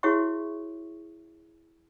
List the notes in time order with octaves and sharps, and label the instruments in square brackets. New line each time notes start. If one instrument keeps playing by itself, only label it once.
[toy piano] E4 F#4 G#4 C#5 E5 C#6